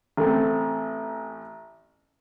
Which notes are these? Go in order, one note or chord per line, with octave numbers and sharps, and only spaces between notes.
A1 A3 C4